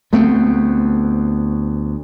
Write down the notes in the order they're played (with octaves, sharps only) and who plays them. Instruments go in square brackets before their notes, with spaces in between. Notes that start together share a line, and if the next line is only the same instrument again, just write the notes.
[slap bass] D2 A3 B3 C4